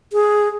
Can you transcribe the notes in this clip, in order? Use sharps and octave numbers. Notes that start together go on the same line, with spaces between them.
G#4